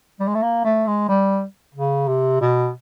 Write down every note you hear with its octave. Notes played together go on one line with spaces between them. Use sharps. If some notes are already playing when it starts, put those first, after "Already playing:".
G3
G#3
A3
A#3
A3
G#3
G3
C#3
C3
B2